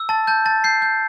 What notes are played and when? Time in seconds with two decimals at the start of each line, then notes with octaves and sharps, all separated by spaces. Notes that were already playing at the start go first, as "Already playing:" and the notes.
Already playing: E6
0.09 A5 A6
0.27 A5 G6
0.46 A5 A6
0.64 G6 C7
0.82 G6